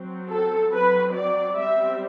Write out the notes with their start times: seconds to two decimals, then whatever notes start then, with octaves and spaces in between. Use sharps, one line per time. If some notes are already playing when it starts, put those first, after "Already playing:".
Already playing: F#3 C4
0.29 A4
0.72 F#3 C4 B4
1.14 D5
1.57 G3 C4 E5